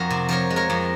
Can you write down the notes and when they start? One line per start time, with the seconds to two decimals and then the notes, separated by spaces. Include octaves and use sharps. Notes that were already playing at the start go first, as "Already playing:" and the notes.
Already playing: F2 F#4 A#4
0.10 C3
0.29 F3 A#4 C#5
0.50 G#3
0.56 A#4 C#5
0.70 F2